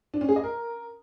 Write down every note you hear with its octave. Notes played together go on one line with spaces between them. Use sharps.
D4
C#4
G#4
D#5
A#4